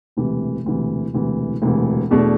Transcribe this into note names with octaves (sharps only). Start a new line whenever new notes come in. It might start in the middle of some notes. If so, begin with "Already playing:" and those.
E1 D2 C3 E3
E1 D2 C3 E3
E1 D2 C3 E3
E1 D2 C3 E3
E2 B2 A3 D4